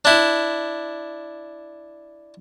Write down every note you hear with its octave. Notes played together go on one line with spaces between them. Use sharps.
D4 E4